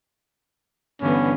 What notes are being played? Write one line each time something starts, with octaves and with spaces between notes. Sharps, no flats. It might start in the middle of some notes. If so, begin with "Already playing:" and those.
G2 D3 E3 B3 C#4